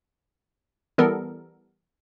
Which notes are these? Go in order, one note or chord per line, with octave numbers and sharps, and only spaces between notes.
E3 G3 B3 A4 A#4